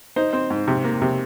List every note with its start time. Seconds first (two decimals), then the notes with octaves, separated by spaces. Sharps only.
0.16 D#4 C5
0.33 C4
0.50 G#2
0.68 C3
0.84 A#3
1.02 C3